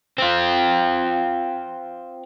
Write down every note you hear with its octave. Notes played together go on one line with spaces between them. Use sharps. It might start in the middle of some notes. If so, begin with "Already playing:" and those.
C4 F4